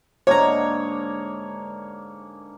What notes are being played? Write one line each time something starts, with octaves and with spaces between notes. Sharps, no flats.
G#2 D3 A#3 C#5 A#5